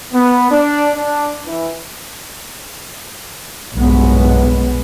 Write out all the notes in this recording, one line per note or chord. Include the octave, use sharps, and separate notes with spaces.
B3
D4
D4
E3
B1 G2 A#2 G#3 B3 C#4